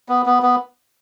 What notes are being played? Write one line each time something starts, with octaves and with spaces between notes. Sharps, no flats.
B3
B3
B3